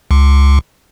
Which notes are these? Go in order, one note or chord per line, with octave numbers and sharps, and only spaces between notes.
C#2